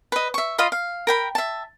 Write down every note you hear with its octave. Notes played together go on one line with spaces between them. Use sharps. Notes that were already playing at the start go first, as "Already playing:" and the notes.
B4 D#5
E5 C#6
F4 D#5 F5 B5
F5
A#4 G5 B5
E5 A5